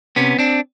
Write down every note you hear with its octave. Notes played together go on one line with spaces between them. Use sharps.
C3 B3 C#4
C4 D4